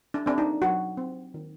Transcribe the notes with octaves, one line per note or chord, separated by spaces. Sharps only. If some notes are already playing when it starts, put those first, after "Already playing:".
D4
C4 D4
D#4
F#3 F#4
C4
D#3